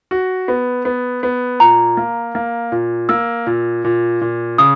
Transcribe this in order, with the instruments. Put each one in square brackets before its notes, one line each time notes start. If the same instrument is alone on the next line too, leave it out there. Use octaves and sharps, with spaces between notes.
[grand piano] F#4
B3
B3
B3
[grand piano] A#2 [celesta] A#5
[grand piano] A#3
A#3
A#2
[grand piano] A#3 [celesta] E6
[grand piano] A#2
A#2
A#2
[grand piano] C#3 [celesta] D#6